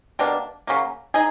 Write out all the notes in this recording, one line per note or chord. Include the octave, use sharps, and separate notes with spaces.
B2 G3 A#3 D4
C#3 F#3 A#3
D#4 G#4